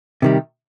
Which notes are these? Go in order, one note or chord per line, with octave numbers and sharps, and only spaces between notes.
C3 D#3 G3